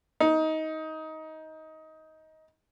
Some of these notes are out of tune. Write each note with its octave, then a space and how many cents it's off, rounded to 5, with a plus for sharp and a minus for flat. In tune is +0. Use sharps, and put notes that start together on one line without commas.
D#4 +20